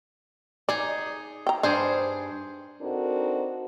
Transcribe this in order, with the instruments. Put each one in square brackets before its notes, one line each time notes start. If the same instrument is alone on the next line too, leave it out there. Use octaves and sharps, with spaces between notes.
[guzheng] D#4 G#4 [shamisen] D5
[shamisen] G5 A#5
[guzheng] G2 G#4 C5 [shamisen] D4
[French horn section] C4 D4 D#4 F#4 A4 A#4